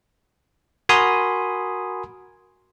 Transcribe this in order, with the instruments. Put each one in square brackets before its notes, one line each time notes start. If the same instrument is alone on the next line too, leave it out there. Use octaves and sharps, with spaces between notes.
[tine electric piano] F#4 A#4 G#5 B5 C6 D#6